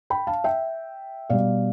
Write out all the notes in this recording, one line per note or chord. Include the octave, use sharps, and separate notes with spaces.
G5 B5
F5 A5
E5 G5
B2 G3 D5 F5